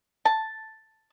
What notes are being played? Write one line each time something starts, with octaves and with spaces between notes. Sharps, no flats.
A5